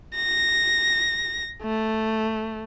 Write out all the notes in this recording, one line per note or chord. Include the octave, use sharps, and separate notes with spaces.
A#6
A3